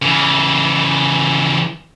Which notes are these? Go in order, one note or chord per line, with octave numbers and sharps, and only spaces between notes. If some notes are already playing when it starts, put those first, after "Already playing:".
C#3 E3